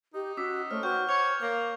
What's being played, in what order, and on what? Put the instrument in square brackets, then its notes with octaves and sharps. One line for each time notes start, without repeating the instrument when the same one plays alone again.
[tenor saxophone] D#4 [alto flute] G4
[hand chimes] C#4 E6 B6 [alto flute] F#4 [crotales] D6
[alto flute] A3 [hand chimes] C5 C#5 [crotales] F6
[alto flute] F#4 [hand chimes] B4 F#5 G5 [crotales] C#6 F6 G6
[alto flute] C5 [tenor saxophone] C#5 [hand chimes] D6 [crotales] F7
[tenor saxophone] A#3 [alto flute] C#5